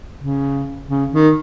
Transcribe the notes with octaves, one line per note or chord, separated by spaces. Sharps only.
C#3
C#3
D#3